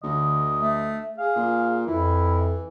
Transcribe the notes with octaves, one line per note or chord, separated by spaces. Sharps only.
D2 D3 D#5
A3
G#4 F5
A#2
F2 E3 E4